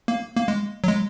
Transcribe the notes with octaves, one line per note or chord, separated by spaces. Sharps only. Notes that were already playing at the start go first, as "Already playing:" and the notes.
A#3
A#3
G#3
F#3
G#3